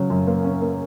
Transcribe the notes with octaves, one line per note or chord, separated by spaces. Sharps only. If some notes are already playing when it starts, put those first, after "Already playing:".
Already playing: C#3 F#3 C#4
F#2
A#3
C#4
A#3